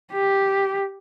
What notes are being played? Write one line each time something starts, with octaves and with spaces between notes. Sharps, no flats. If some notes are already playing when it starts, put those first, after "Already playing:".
G4